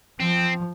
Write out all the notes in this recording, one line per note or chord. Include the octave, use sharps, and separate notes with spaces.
F3 C4